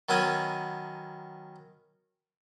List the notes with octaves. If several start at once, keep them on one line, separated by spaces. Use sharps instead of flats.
D#3 F#3 B3 C#4 G#5